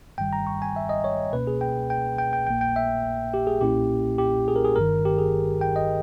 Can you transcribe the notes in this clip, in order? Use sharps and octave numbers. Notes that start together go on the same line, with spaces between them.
G1 G2 D#3 G3 G5
A#5
C#6
G#5
E5
D#5
C#5
C#2 B2 A#3 C#4 B4
G#4
G5
G5
G5
G5
A#1 A#2 A#3 G5
G5
E5
G4
G#4
B1 A#2 A#3 C#4 E4 G4
G4
G#4
A#4
G#4
G1 G2 D#3 A#4
G4
G#4
G5
D#5